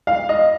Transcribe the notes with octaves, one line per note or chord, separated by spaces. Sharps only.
F5
D#5